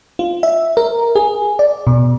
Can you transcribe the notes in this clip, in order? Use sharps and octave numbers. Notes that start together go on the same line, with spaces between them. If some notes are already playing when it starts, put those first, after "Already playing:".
F4
E5
A#4
G#4
D5
B2